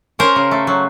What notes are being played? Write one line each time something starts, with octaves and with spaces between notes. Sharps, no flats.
C#4 A#4 C5
C#3
A3
F#3